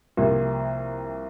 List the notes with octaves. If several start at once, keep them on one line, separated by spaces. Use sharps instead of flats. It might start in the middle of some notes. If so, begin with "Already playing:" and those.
C2 C3 F3 A#3